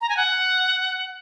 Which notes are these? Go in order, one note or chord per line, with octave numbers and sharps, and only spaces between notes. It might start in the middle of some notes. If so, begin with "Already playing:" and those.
A#5
G#5
F#5